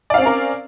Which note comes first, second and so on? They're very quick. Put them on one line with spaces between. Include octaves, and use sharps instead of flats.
D5 F5 C4 C#4 A#4